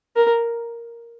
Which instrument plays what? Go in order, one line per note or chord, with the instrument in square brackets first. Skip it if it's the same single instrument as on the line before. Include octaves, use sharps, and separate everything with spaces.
[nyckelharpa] A#4